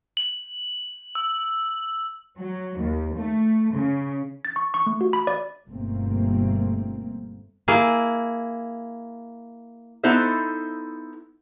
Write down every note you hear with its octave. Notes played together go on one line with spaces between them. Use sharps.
F#7
E6
F#3
D#2
A3
C#3
A6
C#6
C#6
A3
F#4
B5
D5
G1 B2 A3 A#3 C4
A#3 E4 G#4
B3 D#4 E4 A4 C5 E5